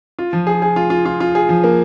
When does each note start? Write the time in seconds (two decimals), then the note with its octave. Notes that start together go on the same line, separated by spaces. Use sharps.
0.19 F4
0.33 F3
0.47 G#4
0.62 G#4
0.76 F4
0.90 F4
1.05 F4
1.20 F4
1.35 G#4
1.49 F3
1.64 A#3